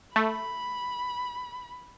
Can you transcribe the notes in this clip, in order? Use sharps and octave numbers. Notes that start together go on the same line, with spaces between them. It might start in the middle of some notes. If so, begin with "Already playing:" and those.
A3 B5